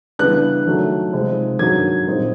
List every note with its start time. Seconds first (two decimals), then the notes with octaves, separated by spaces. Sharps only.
0.19 C#3 E3 G3 B3 D4 F#6
0.66 D#3 F#3 A3
1.13 C3 F3 G#3 C4 D#4
1.59 G2 D#3 F#3 A#3 G#6
2.07 A#2 G3 C4 D#4